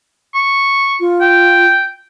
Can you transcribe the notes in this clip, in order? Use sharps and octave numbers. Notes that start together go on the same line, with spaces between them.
C#6
F4
G5